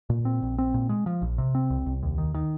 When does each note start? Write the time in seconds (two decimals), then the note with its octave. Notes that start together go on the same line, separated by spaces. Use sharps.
0.10 A#2
0.25 C4
0.42 A#1
0.58 C4
0.74 A#2
0.89 G#3
1.06 F3
1.22 A#1
1.38 C3
1.55 C4
1.70 C2
1.86 C2
2.03 D#2
2.18 D#3
2.34 D#3